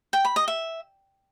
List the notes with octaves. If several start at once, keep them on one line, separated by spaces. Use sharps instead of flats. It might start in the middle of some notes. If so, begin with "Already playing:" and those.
G5
B5
D#5
E5